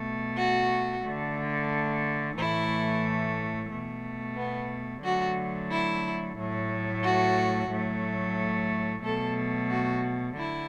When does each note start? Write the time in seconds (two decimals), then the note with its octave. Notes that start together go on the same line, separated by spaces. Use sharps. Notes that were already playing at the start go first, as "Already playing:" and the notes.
Already playing: B2 A3
0.37 F#4
1.04 D3 A3
2.37 A2 E3 A3 E4
3.71 B2 A3
4.37 B3
5.04 D3 F#3 A3 F#4
5.71 E4
6.38 A2 F#3 A3
7.04 F#4
7.71 A2 F#3 A3
9.04 B2 F#3 A3 A4
9.71 F#4
10.37 D3 E4